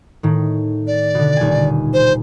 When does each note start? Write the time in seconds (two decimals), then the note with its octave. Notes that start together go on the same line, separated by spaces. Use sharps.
0.23 A2 D#3
0.87 D5
1.15 B2 D3
1.37 D#1 G#5
1.93 C5